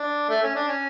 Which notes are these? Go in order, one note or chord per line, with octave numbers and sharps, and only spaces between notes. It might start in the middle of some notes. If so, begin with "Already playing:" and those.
Already playing: D4
A3
C#4
D4
C#4